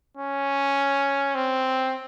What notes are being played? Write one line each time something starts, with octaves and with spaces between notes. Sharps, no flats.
C#4
C4